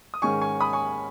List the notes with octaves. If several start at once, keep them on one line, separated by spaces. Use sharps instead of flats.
D#6
G#2 D#3 G#3 C#4 G#5 C#6
G#5 C#6
B5 D#6
G#5 C#6